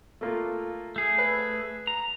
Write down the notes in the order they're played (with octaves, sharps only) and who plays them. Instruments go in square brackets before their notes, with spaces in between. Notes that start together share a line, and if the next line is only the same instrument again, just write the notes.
[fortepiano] A3 A#3 F4
[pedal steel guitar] A3 G#4
[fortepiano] B4
[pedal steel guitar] A#5